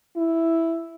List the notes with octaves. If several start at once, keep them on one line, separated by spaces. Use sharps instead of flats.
E4